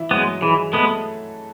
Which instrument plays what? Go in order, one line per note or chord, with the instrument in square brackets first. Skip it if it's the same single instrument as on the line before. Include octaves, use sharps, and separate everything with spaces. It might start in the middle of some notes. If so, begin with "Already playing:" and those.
Already playing: [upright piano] E3 E4
[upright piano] F#3 F#4 [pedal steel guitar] G#3 B3
[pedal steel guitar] E3 [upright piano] G#3 G#4
[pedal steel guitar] G#3 B3 [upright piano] A3 A4